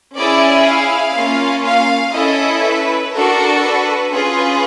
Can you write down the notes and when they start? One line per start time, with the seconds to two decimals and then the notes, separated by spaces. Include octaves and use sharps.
0.16 C#4 E4 G#4 D5
0.65 F5
1.15 A#3 C#4 F4
1.64 F5
2.14 C#4 E4 A4 D#5
2.64 B4
3.13 D4 F#4 A4 A#4
3.63 B4
4.12 C#4 F4 G#4 B4